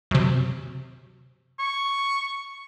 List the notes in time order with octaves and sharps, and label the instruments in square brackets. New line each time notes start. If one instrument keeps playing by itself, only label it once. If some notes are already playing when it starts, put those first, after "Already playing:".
[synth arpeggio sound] F#2 C3
[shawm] C#6